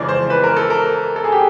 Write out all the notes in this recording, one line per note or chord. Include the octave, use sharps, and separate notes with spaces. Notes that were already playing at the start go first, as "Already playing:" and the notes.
Already playing: F2 C#3 E3 G#3 D5
C5
B4
A#4
A4
A#4
A4
G#4
G4